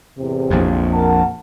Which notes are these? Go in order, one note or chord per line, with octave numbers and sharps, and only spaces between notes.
E2 A2 C3
A#1 F2
A#4 F#5 A5